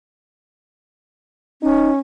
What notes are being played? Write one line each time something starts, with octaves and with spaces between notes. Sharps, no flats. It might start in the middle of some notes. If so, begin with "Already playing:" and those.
C#4 D#4